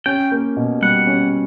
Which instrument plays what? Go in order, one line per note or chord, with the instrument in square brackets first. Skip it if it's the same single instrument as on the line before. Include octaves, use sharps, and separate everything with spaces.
[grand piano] C#4 [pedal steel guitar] G5
[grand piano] A#3
B2
[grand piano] G3 [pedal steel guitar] F#5
[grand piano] C#4